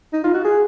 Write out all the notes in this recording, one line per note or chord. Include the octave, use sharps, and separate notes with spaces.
D#4
F4
F#4
G#4